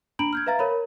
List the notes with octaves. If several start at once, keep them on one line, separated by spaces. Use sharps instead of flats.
D4 A#5 B5 D7 F#7
F6 G6 G#6
B4 E5 F5 A#5 A6
A#4 C#5 B5